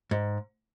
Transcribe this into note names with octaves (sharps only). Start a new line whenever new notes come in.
G#2